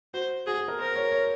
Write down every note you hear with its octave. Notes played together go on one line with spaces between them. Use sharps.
F#4 C5
F#4 G#4
G#4
A#4
A#4 C5
C#5
C#5